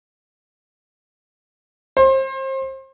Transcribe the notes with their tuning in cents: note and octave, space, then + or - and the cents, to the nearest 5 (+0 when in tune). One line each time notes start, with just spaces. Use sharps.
C5 +30